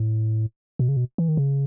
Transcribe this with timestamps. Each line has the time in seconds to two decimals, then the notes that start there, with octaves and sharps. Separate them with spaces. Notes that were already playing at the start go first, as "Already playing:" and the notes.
Already playing: A2
0.79 B2
0.88 C#3
0.97 B2
1.18 E3
1.28 D#3
1.37 C#3